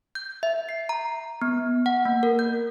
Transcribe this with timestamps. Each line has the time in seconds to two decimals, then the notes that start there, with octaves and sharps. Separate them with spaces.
0.15 G6
0.43 E5
0.69 C7
0.89 A#5
1.42 B3
1.86 F#5
2.05 A#3
2.23 A#4
2.39 G6